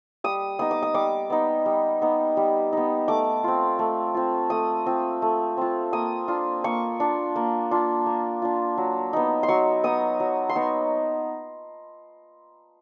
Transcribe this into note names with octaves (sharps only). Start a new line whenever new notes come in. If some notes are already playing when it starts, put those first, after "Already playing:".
G3 D#6
B3 D#4 D#6
D6
D#6
G3 D6
B3 D#4
G3
B3 D#4
G3
B3 D#4
A3 D6
C4 F4
A3
C4 F4
A3 D#6
C4 F4
A3
C4 F4
A#3 D#6
D4 F4
A#3 C#6
D4 F4
A#3
D4 F4
A#3
D4 F4
F#3
B3 D#4
C6
F#3 C#6
B3 D#4 D#6
F#3
C6
B3 D#4 C#6